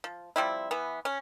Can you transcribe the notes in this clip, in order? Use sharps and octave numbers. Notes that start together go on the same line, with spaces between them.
F3
F3 G3 C4 E4
E3 B3
C#4